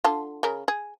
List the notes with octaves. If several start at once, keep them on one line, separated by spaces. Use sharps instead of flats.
D3 F4 A5
C#3 A#4
G#4